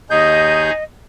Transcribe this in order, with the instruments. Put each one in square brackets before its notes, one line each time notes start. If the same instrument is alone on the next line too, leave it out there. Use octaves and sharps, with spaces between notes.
[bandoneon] D#2 G6 [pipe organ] D#4 G#4 [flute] D#5